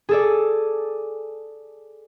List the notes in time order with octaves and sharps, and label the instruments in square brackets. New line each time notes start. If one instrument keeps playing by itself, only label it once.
[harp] G#4 A4 D5